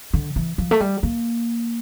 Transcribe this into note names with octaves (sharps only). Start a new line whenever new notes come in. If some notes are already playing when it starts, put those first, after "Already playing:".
D3
E3
F3
A3
G3
A#3